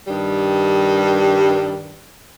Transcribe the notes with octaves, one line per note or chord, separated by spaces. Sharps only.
G2 D#3 G3